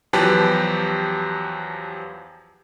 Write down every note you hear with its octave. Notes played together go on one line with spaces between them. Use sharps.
E2 F3 F#3 G4 B4 A5